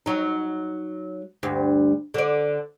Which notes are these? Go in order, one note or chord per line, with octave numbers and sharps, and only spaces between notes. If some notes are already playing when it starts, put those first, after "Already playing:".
F#3 D#4
D2 G2
D3 D5